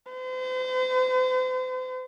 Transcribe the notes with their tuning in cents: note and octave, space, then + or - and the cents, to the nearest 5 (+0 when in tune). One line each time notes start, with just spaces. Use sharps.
C5 -40